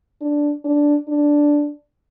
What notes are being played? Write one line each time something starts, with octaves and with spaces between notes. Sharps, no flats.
D4
D4
D4